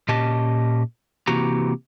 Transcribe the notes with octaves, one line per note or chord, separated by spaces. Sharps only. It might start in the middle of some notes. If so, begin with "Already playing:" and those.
A#2 C#4 G4 D#5 A5
C3 E3 A#3 F#4 G4 A#5